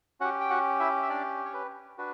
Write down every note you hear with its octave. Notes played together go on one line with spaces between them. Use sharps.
C#4 F#4 G4 F#5
G5
F#4 F#5
E4 E5
E5
D4 D5
C#5
B4
D4 F#4 B4